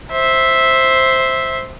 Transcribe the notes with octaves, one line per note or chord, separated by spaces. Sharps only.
C5 E5